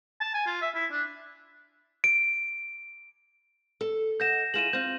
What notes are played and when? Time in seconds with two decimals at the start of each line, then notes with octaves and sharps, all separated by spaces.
0.21 A5
0.34 G#5
0.47 F4
0.62 E5
0.75 E4
0.92 D4
2.04 D7
3.81 A4
4.20 D#5 F#5 G6 A#6 E7
4.54 E4 F4 G#4 D#7 E7 F#7
4.73 C4 F4 G6